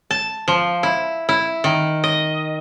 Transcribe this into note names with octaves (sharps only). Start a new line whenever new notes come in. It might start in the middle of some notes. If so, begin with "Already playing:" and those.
A5
F3
E4
E4
D#3
D#5